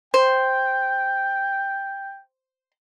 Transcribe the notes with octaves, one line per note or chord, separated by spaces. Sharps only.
C5 G5